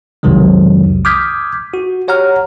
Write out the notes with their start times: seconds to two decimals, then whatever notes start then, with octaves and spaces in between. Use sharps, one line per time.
0.23 B1 F2 C3 D#3 F#3 G#3
1.05 D6 D#6 F6 G6 G#6 B6
1.74 F#4
2.08 G4 C#5 F#5 A#5 F6